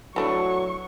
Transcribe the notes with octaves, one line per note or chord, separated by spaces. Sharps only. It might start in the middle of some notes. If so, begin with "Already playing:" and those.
E3 F#3 A3 D4 C#6